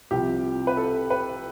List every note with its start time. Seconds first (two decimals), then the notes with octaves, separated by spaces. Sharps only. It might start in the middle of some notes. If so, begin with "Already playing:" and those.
0.11 C2 C3 F3 G4
0.67 B4
0.77 A4
1.10 B4